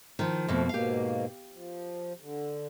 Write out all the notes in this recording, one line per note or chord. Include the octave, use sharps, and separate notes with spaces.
D#3 F3
F2 B2 F3 A3 A#3
G#2 B2 A#3 G4 F5
F3
D3